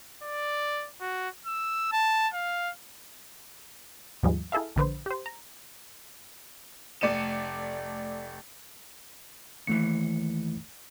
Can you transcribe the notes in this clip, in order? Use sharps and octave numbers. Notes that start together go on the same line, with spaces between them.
D5
F#4
E6
A5
F5
D#2 G#2 F3 G3 G#3
E4 G#4 A4 E5 F5
A#1 D3 B4 C5
G4 C5
A#5
F1 A3 D5 C#7 D#7 E7
D#2 E3 A3 C#7